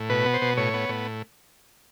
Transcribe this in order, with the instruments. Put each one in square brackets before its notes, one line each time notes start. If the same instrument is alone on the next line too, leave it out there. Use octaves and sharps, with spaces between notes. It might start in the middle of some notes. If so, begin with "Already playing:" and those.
Already playing: [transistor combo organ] A2
B2 B4
B3
C5
B2
A2 C#5
B3
A2